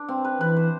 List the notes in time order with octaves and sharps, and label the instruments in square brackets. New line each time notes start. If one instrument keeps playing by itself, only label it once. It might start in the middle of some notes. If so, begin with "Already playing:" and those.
Already playing: [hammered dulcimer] D4
C4
B4
[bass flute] E3 [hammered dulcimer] B4
[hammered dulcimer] C5